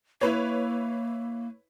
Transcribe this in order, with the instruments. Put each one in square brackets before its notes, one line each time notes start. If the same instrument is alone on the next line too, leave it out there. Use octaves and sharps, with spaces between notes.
[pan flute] A#3 [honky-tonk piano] E4 B4 C#5